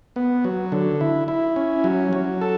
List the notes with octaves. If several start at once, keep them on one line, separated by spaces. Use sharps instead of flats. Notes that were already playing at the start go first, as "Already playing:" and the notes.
B3
F#3
D3
E4
E4
C#4
F#3
F#3
A4